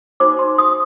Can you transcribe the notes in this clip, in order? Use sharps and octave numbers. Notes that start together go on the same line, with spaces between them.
D#4 F#4 C5 D6
C6
D#6